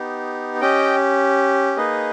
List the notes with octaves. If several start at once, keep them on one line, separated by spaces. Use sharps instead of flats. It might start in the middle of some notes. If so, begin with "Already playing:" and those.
Already playing: B3 D#4 G4
C#4 G4 D#5 G5
A#3 D#4 G#4 B4 D#5